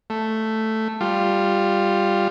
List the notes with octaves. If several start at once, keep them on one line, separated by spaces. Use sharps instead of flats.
A3
G3 F4